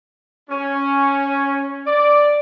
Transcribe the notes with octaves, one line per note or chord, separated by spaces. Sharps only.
C#4
D5